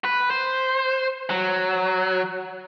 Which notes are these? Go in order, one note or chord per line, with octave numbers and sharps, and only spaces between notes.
B4
C5
F#3